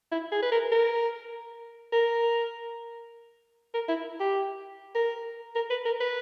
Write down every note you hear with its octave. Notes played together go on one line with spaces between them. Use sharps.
E4
G#4
B4
A#4
A#4
A#4
A#4
E4
G4
A#4
A#4
B4
A#4
B4